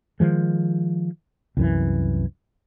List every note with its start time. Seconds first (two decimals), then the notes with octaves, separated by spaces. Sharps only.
0.20 D#3 F3 G#3
1.57 C2 F#2 E3